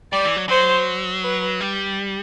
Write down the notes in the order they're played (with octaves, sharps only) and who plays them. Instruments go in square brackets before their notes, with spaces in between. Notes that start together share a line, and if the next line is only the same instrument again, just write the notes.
[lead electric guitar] G3 [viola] D5
[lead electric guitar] E3
F#3
[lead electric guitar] F#3 [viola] C5
[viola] B4
[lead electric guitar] G3